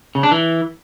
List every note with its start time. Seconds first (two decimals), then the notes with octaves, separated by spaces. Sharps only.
0.15 C#3
0.23 D4
0.32 E3